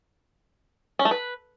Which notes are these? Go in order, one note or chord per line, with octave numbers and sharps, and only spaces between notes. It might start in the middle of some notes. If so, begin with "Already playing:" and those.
C#4
A3
B4